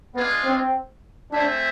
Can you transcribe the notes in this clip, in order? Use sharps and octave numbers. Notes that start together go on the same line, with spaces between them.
G#3 B3 D4 F4 G#4
C4
A3 C4 D4 G#4 C5 E5